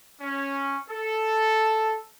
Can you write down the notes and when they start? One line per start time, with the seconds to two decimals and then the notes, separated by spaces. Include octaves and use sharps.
0.21 C#4
0.90 A4